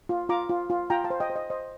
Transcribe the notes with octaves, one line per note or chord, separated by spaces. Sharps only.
F4
F4 A#5 D6
F4
F4
F4 G5 A#5
F5 A5
C5
D#5 G5
C5
D#5
C5 D#5